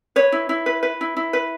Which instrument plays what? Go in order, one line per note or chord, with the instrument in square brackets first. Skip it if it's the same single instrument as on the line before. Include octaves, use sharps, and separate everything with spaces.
[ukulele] B4 C#5
E4
E4
B4
B4
E4
E4
B4